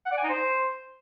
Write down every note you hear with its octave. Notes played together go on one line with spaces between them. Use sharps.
F#5
D5
G#5
D#4
C5